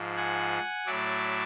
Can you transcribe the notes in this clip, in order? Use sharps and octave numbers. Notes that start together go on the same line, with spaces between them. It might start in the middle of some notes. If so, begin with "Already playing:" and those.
Already playing: G#2 F3
F#5 G#5
A2 F#3 D5 E5